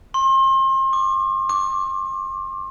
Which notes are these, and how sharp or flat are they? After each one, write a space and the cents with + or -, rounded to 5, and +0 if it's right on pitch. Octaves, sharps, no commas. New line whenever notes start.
C6 +35
D6 -10
D6 -20